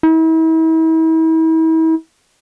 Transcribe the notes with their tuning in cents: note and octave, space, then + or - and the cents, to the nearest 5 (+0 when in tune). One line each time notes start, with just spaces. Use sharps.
E4 -40